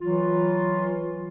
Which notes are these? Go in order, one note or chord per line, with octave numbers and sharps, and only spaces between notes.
E3 F#3 F4